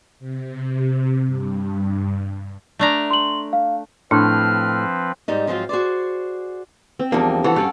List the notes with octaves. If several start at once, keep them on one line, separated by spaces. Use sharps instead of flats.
C3
G2
A3 D4 A#5
C6 F#7
F5
A2 F3 C4 D4 B4 F6
G#2 G3 D#4
G#2 F3 F#3 B3 C4 F4
F#4 G#4 C5 D5
C4
E2 F3 G3 A#3 D4
E3 F#4 A4 C#5
G2 C#4 D5 F5